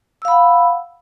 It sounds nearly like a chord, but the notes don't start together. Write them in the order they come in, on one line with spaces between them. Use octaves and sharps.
E6 F5 B5 F#5